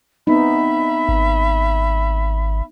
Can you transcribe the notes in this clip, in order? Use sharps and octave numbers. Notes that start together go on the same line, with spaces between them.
B3 C4 D#4 E5 B5
G#1